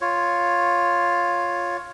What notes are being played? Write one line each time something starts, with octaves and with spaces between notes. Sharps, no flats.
F4 C#5